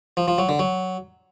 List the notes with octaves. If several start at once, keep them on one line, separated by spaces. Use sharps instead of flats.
F3
F3
F#3
D3
F#3